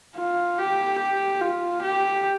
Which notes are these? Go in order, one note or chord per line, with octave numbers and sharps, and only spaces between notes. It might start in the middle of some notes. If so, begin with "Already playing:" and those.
F4
G4
G4
F4
G4